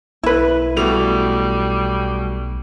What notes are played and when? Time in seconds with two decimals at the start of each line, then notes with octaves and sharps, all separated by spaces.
0.23 B1 E4 B4
0.76 B2 G3 A3 F7